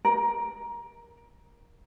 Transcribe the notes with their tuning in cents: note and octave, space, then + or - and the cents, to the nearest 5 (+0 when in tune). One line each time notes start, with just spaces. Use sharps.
A#4 +20